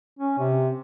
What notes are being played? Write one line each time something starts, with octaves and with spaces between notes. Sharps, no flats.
C#4
C3